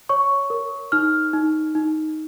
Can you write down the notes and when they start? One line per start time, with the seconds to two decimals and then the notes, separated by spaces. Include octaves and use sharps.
0.09 C#5 C#6
0.50 A#4
0.92 D#4 F6
1.33 D#4
1.75 D#4